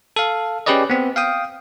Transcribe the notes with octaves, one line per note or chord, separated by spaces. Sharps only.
A4 F5
C#4 G4 G#4 B4 D5 D#5
B3 C4
F5 G5 D#6